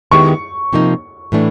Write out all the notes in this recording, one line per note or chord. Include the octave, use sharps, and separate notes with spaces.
D#3 G#3 B3 E4 G4 C#6
C3 F3 A#3 D#4
A2 E3 A3 D4